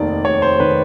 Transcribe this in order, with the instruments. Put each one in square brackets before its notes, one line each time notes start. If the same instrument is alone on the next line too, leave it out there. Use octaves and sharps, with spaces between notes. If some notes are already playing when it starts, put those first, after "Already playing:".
Already playing: [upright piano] F1 D#2 D#3 D5
F1 C#5
C5
D#3 B4